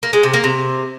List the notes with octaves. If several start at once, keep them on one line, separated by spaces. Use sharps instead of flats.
A#3
G#3
C3
A#3
C3